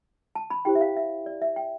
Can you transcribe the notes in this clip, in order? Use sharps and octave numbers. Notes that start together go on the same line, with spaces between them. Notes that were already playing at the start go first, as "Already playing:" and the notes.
A5
B5
E4 G4 C5 G5
E5
F5
E5
D5
E5
G5